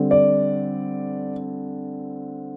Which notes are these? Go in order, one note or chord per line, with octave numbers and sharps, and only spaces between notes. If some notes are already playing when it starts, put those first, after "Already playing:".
Already playing: D3 G3 C4
D5